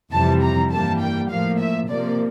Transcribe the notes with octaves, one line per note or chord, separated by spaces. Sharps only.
F2 C3 E3 G3 A5
A#5
G2 E3 G3 A#3 A5
G5
A2 F3 A#3 F5
E5
C3 F3 A#3 D5